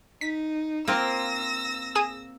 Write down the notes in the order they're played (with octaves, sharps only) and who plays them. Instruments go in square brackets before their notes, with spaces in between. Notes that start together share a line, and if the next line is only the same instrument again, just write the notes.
[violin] D#4 [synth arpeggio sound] B6
[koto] A#3 C4 F4 [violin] E6 A#6
[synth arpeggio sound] G#4 D#6 E7